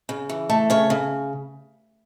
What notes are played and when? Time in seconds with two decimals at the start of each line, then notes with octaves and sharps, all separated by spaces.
0.09 C#3
0.29 E3
0.50 A3
0.70 C#3 C#5
0.90 C#3